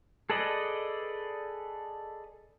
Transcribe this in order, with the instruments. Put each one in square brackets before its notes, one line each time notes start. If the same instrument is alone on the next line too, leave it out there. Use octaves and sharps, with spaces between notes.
[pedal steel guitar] G#4 A4 B4 D5 D#5